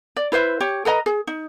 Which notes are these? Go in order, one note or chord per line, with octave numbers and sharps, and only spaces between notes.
D5
E4 B4 C5 E5
G4 C#5
A4 B4 D#5 A#5
G#4
D#4